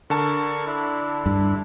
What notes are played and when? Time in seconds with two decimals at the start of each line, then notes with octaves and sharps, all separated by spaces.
0.10 D3 A#4 A5 C#6
0.67 D4 E4
1.26 G2